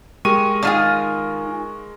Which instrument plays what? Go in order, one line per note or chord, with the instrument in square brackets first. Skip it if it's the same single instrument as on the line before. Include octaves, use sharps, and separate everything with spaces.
[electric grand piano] G#3 A#4 D#7 [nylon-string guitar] G4 [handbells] C#6
[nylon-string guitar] D#3 D#4 [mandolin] D4 F4 G#4